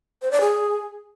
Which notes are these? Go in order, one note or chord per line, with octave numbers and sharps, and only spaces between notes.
C5
D5
G#4